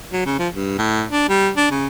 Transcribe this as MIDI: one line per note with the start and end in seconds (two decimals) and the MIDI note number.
0.13 0.24 54
0.26 0.37 49
0.39 0.48 53
0.53 0.73 43
0.78 1.04 45
1.11 1.28 62
1.29 1.50 55
1.57 1.67 62
1.71 1.87 49